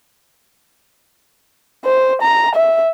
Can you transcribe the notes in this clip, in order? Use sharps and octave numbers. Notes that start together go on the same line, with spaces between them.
C5
A#5
E5